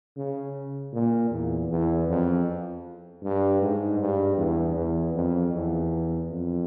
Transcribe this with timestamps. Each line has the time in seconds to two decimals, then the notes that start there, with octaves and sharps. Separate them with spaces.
0.17 C#3
0.93 A#2
1.31 E2
1.69 E2
2.08 F2
3.23 G2
3.61 G#2
3.99 G2
4.38 E2
4.75 E2
5.14 F2
5.53 E2
6.30 F2